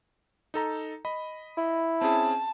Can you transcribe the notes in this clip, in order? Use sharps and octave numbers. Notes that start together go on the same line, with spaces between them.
D#4 A4 A#5
D#5 B5
E4
C4 C#4 G#4 A5